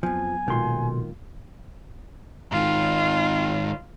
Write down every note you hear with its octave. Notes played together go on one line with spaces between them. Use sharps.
F2 F3 F#3 B3 G#5
B1 A#2 D#3 G#3 F4 C6
G#2 D#3 F4